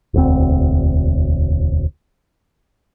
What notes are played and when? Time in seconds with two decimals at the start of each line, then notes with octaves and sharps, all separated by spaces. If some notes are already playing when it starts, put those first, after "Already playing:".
0.14 E1 D2 C4